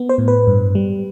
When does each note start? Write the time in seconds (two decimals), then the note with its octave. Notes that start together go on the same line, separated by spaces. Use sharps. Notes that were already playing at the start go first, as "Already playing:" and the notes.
Already playing: B3
0.09 C5
0.18 A2
0.28 B4
0.47 G2
0.75 G3